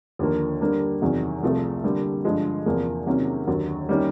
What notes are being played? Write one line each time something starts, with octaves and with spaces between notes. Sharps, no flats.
D#2 D3 F3 A#3
D3 G3 A#3 D4
E2 C3 D#3 F#3
C2 C3 F3 A3
D3 G3 A#3
G2 D3 F3 G#3
E2 C3 F3 A#3
C3 D#3 F#3 A#3 C#4
D#2 D3 F#3
D#3 G3 A#3 C#4